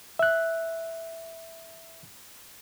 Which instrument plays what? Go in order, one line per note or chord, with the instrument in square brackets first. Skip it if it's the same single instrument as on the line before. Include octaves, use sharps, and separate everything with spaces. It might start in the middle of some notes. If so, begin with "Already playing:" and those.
[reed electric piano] E5 F#6